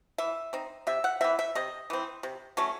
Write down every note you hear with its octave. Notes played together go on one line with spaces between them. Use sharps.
E3 E5
C4 D#4
C3 E5
F#5
E3 C4 E5
E5
C3 D#5
E3 C4
C3
F#3 A3 C#4